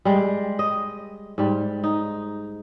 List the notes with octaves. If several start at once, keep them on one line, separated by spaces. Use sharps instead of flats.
G3 G#3
D#5
G#2 G3
D#4